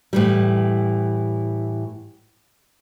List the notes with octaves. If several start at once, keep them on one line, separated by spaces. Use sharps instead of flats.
A2 E3 G3